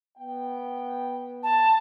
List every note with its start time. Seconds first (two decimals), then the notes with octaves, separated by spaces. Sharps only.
0.18 B3 G5
1.43 A5